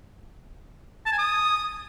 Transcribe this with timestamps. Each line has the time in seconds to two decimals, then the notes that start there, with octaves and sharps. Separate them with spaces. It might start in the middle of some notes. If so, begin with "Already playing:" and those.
1.06 A5
1.12 G#5
1.19 D#6